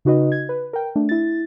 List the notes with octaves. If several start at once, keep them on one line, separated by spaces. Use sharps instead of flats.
C#3 D#4 F#4 B4 D#5
G#6
B4
A#4 G5
A3 D4
E4 A6